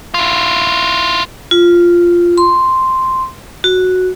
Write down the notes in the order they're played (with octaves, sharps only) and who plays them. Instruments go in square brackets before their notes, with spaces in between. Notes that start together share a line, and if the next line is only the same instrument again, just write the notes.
[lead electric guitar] E4 F4
[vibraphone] F4
C6
F#4